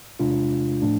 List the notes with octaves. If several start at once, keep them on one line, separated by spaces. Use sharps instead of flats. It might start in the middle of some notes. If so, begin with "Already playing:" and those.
E2 C3 G#3 D4 F4
A2 F3 A3 D4